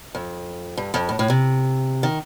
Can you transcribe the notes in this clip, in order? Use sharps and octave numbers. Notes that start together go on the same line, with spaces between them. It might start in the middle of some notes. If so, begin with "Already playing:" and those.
F2
G2
F2
A2
A2
C3
D#3